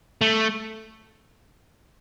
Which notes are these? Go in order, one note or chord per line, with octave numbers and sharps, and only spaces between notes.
A3